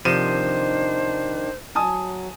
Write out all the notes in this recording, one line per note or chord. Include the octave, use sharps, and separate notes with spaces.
C3 D#3 F3 D4 C5 D#7 E7
F#3 G#5 A5 D#6